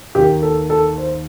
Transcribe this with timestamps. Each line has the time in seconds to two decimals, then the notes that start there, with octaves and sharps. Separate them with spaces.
0.15 D#2 D#3 G4
0.42 A4
0.70 A4
0.98 C5